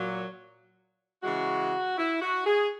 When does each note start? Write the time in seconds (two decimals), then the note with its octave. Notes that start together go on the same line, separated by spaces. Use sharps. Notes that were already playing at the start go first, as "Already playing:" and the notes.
Already playing: A#2 F#3
1.23 C#3 E3 G#3 F#4
1.97 E4
2.21 F#4
2.46 G#4